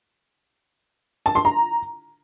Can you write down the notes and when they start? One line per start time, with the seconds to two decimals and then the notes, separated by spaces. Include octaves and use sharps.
1.26 A5
1.35 C6
1.45 A#5